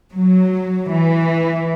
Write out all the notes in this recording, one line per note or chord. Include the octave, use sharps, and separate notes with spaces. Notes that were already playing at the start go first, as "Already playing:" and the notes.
F#3
E3